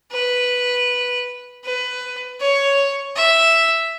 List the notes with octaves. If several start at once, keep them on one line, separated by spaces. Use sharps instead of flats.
B4
B4
C#5
E5